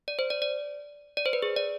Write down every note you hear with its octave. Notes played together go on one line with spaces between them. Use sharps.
D5
C5
D5
D5
D5
C5
B4
G#4
D5